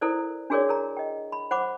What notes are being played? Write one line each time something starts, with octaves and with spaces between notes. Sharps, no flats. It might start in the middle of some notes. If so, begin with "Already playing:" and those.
E4 A4 A#4 C5 D5
D4 F#4 G#4 A#4 C#5 D5
A#4 A#5
D#5 G5
B5
C5 F#5 B5 D6